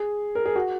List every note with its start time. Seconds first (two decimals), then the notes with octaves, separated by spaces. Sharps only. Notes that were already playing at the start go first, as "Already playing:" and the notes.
Already playing: G#4
0.35 A#4
0.46 G#4
0.56 F#4